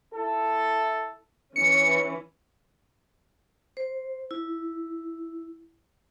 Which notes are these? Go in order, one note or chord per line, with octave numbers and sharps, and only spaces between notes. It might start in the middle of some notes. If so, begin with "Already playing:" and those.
E4 A4
E3 C#4 C#7
C5
E4